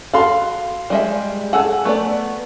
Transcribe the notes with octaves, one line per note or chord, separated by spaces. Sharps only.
F#4 A4 F5 C6
G3 G#3 E5
G#4 A4 F#5 E6
A3 B3 D5